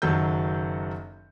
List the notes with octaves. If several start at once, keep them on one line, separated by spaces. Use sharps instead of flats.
F#1 D#3 F#3 A4 G6